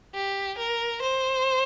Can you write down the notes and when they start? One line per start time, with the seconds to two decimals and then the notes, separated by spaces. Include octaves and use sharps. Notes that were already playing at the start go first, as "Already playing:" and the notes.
0.14 G4
0.58 A#4
1.02 C5